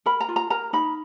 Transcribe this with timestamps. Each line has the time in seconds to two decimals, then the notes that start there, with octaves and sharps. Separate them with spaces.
0.06 A#4 B5
0.20 A#5
0.28 F4
0.36 A#5
0.50 A#4 A#5
0.73 D#4 B5